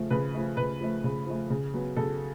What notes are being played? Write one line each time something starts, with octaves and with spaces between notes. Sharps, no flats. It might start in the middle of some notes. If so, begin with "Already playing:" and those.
Already playing: C#3 F3 A3
C#3 B4
F3 A3
C#3 B4
F3 A3
C#3
F3 A3
C#3
F#3 B3
C#3 A4